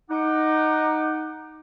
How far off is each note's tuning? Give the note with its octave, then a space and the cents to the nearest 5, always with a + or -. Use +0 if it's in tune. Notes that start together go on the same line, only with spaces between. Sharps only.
D#4 +0 F#5 +0 D6 +25